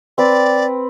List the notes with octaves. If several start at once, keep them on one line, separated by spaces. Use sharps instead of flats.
C4 B4 D5